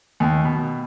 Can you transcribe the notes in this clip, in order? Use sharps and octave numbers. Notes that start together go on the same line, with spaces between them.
D#2
B2